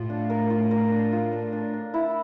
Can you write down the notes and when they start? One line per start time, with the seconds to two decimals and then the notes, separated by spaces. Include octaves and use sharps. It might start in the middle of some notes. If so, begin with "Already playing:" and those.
Already playing: A2 F4
0.10 D4
0.30 A#4
0.50 F4
0.71 A#4
0.92 D4
1.13 F4
1.33 D4
1.53 D4
1.74 D4
1.94 E4